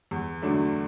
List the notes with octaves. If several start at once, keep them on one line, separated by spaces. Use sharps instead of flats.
E2
D3 F#3 A3 D4